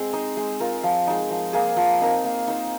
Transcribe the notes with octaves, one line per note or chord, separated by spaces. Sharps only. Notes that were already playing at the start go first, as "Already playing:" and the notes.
Already playing: G#3 C4 G#4
D#4 C5 D#5
G#3
F4 A#4
F3
G#3 D#4
F3
A#3 G#4
F3
C4 D#4 A#4
A#3
D#4 C5